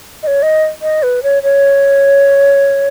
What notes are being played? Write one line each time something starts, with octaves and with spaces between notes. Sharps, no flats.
D#5
C#5
D#5
D#5
B4
C#5
C#5